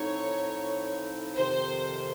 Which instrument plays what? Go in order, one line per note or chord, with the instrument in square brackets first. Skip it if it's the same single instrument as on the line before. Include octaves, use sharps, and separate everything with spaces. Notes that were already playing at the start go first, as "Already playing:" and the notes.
Already playing: [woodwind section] A2 F3 C4 D#4 [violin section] C#5
[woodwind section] F2 C3 D#3 [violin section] C5